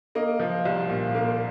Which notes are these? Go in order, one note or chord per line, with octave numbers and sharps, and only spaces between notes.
A#3 D#5
F3
C2
A#2
A#3